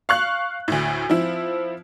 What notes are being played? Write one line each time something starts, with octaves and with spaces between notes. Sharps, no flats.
F5 C#6 F#6
D2 A2
F3 C4 E4